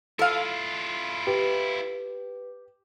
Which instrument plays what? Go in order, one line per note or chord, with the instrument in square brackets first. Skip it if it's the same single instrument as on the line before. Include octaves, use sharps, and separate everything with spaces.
[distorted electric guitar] E4 F4 [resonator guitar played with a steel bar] A4 F5
[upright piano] G4 [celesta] B4